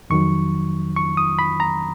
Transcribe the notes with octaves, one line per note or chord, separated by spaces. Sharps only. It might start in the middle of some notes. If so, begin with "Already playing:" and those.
F2 D#3 F#3 C#6
C#6
D#6
B5
A#5